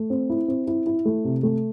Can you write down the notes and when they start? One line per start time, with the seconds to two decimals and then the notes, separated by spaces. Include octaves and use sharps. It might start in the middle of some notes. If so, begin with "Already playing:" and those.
Already playing: A3
0.10 C4
0.30 E4
0.48 C4
0.67 E4
0.86 E4
1.05 A3
1.24 C3
1.43 A3